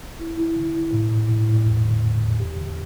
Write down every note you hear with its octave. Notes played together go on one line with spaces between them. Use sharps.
E4
E4
D3
E4
A2
A2
A2
A2
E2
D3
E2
E2
G4
D3